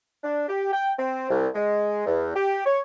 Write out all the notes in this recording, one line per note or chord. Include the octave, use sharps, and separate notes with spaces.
D4
G4
G5
C4
C2
G#3
E2
G4
C#5